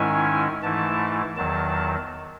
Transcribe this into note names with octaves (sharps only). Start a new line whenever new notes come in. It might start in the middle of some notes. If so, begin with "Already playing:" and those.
Already playing: G#2 D#3 G#3 C#4 E4 G#5
G#2 E3 A3 E4 A5
E2 D#3 F#3 A5